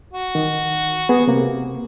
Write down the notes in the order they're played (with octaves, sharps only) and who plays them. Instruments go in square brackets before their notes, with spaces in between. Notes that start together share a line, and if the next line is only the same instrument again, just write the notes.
[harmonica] F#4
[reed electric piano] D#3
B3 G#4
C3 A#3